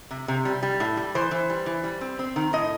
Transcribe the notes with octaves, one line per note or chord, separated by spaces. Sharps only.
C3
C3
G3
G3
A2
G3
E3 C5
E3
G3
E3
G3
C4
C4
D#3
A2 D#5